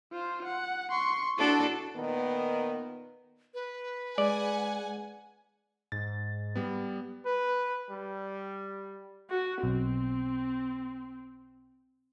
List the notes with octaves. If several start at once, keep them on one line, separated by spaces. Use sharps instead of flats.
F4 C5
F#5
C6 C#6
D4 E4 F#4 A4
A#2 D#3 B3
B4
G#3 D5 F#5 G#5
G#2 A6
G3 B3
B4
G3
F#4
B1 C4